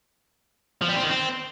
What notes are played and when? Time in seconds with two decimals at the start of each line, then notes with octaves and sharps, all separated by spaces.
0.82 F3
0.89 G3
0.96 C4
1.03 D#3
1.10 C4